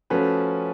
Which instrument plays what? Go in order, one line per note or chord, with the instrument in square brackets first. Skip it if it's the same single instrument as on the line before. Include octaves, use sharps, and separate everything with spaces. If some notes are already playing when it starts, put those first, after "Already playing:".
[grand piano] F3 A3 C#4 F#4 B4